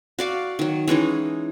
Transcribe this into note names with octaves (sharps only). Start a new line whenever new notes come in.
F#4 D5 F5
D#3 F#3
E3 G#3 C#4 D#4